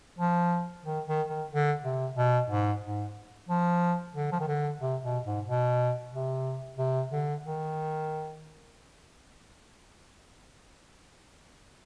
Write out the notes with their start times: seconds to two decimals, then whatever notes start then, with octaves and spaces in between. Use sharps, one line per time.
0.18 F3
0.85 D#3
1.07 D#3
1.29 D#3
1.50 D3
1.84 C3
2.16 B2
2.49 G#2
2.83 G#2
3.49 F3
4.15 D3
4.32 F3
4.40 D#3
4.48 D3
4.81 C3
5.03 B2
5.25 G#2
5.46 B2
6.13 C3
6.78 C3
7.12 D3
7.45 D#3